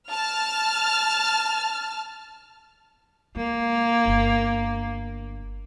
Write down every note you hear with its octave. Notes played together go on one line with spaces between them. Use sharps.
A5 F6
G#3 A#3
G1 F4